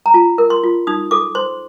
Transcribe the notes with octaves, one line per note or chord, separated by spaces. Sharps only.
A#5
F4 A5
A#4
C6
F4
D#4 D#6
A4 D6
C5 C6